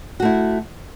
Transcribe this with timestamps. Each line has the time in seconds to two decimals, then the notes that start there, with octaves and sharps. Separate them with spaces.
0.20 F#4
0.22 A3
0.25 E4